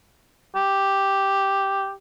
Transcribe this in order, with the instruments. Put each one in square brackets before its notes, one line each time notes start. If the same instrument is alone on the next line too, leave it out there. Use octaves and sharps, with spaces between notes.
[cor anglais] G4